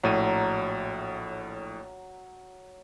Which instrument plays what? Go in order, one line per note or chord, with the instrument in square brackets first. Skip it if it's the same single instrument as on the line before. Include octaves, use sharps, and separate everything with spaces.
[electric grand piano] A#1 A2 D#7 [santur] F#3